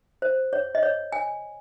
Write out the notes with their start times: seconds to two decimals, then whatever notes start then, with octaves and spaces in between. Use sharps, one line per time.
0.22 C5
0.53 C#5
0.75 D#5
0.83 C#5
1.12 G#5